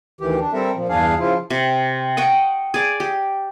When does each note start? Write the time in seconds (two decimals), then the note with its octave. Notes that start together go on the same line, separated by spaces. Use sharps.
0.21 D2 D#3 E3 G4
0.40 D4
0.53 G3 C4 A4 A#4 E5
0.75 A#2 F3
0.89 E2 G2 D4 G#4 F5
1.19 C#3 F3 E4 F4
1.50 C3
2.17 D#5 F#5 G5 C#6
2.74 G#4 D5
3.00 G4